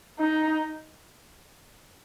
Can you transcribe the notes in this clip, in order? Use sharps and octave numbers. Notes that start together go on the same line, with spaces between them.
D#4